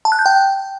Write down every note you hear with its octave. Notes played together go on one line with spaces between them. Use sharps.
A5
F#6
G6
G5